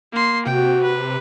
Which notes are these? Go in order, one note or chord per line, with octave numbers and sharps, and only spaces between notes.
A#3 C6
C3 F#4 G5
B4